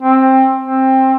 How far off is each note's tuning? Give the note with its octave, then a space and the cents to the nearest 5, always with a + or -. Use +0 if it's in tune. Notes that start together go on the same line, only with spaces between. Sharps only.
C4 +15
C4 +15